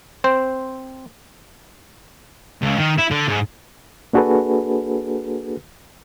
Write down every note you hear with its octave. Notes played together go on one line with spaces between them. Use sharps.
C4 C5
C#2
D#3
E4
D3
G#2
A#3 D4 F#4 G#4 A4 B4